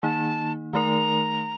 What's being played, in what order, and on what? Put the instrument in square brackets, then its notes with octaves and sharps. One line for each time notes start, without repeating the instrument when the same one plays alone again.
[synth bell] D#3 A#3 D#4 [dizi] A5
[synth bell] D#3 A3 D#4 A#4 [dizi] A#5